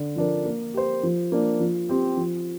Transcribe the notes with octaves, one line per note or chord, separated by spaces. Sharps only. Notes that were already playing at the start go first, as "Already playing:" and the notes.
Already playing: D3
F3 D4 A#4
A#3
G4 C5
F3
A#3 D4
F3
C4 G4
F3